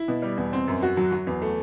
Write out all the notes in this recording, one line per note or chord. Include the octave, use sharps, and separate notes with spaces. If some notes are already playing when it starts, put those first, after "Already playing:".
Already playing: E4
B2
G3
E2
C4
F#2
F#4
F#3
F#3
E2
A3